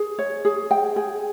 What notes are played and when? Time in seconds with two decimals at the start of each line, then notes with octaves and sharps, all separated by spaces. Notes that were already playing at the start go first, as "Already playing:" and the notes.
Already playing: G#4
0.18 C#5
0.45 G#4
0.71 G5
0.96 G#4